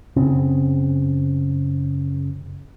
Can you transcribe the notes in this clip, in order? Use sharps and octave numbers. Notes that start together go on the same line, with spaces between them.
F#1 C#3 C4